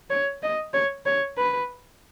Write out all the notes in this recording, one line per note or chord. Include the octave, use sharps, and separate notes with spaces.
C#5
D#5
C#5
C#5
B4